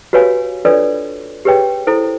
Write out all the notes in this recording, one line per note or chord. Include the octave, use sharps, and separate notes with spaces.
F#4 G4 B4 C#5 F5 G#5
D4 F4 A4 B4 C#5 D5
G4 G#4 B4 C#5 G5
E4 A4 C5